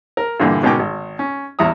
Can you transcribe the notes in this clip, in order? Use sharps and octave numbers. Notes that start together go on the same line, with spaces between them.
A#4
G2 A#2 D3 E3
G#2 B2 C#4 A#4 G5 D6
G#1
C#4
A1 E2 E4 A#5 D#6